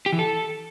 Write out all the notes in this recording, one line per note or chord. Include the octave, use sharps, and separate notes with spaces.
G4
E3
A4